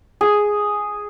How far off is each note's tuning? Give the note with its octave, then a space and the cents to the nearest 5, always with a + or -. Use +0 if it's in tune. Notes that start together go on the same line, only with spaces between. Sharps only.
G#4 +0